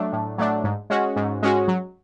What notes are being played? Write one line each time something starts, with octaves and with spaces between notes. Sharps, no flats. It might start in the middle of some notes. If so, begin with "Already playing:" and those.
Already playing: F#3 A3 D4
A2
F#3 A3 D4
G#2
G#3 C#4 F#4
G#2
G#3 C#4 F#4
F#3